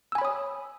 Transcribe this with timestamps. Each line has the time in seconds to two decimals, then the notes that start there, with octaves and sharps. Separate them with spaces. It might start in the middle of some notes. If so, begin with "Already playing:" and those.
0.12 E6
0.15 G#5
0.18 B5
0.22 C#5
0.25 D#6